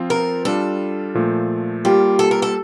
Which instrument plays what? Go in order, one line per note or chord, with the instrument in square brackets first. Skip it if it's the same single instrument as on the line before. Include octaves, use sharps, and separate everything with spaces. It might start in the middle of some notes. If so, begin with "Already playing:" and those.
Already playing: [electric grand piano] F3 C4 F4
[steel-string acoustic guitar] A#4
[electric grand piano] G3 D4 F4 [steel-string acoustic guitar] A4
[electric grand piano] A#2 F3 A3
[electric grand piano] G3 A#3 F4 [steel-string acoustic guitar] G4
[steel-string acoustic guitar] A4
A#4
A4